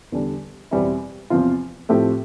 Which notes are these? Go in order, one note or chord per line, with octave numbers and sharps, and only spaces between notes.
E2 D3 G3 D4
E2 B2 G3 C4 E4
E2 C3 F3 C4 F4
A2 F3 A3 C4 G4